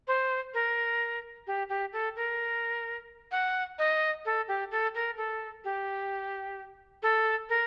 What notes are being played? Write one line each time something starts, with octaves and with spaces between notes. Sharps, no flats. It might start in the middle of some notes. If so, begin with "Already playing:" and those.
C5
A#4
G4
G4
A4
A#4
F#5
D#5
A4
G4
A4
A#4
A4
G4
A4
A#4